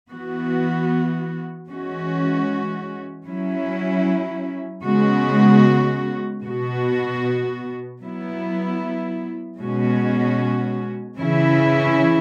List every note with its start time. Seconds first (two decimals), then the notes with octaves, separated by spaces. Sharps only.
0.11 E3 B3 F#4
1.69 E3 G#3 C#4 F#4
3.27 F#3 C#4 E4
4.84 C#3 G#3 B3 F#4
6.43 B2 B3 F#4
8.01 F#3 B3 E4
9.59 B2 G#3 C#4 F#4
11.17 C#3 E3 C#4 E4